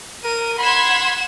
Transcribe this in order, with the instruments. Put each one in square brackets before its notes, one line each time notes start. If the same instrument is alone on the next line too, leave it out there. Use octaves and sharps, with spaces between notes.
[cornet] A#4 [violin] D#7
[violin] F#5 E7 [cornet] B5 [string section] C6 G#6 B6